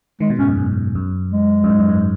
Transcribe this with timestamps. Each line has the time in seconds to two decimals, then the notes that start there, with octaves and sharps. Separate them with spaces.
0.20 D#3 G#3
0.30 B2
0.39 G#2 C#4
0.48 F#2
0.58 G#2
0.95 F#2
1.33 G#3
1.64 F#2
1.69 G#2
1.79 F#2
1.89 G#2